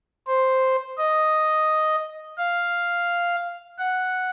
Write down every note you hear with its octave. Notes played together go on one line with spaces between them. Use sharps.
C5
D#5
F5
F#5